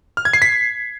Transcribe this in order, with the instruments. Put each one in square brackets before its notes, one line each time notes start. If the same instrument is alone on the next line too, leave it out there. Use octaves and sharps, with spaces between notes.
[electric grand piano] F6
G#6
C7
B6